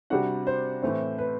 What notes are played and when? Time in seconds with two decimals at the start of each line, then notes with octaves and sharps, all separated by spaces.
0.10 C3 G3 D4 F#4 F#5
0.47 C5
0.82 A2 E3 A3 C4
1.18 B4